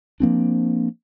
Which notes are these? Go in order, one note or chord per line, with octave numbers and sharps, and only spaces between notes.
F3 A#3 C4 D4